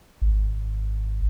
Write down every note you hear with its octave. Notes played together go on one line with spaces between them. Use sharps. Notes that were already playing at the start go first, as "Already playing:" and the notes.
G#1